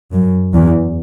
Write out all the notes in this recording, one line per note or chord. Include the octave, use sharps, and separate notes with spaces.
F#2
E2